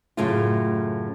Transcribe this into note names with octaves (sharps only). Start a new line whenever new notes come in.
F#2 A2 C#3 A3 F4